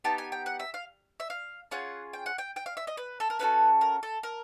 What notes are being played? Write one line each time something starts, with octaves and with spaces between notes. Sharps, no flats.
B3 D#4 G4 A5
G#5
G5
F#5
E5
F5
E5
F5
C#4 F4 G#4 F#5
G5
F#5
G5
G5
F5
E5
D#5
B4
A4
A#4
A3 C#4 F#4 A4 B4
A#4
A4
A#4